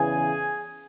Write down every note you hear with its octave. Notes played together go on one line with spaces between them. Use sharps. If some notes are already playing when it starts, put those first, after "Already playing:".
Already playing: E2 C#3 E3 G#4 G#5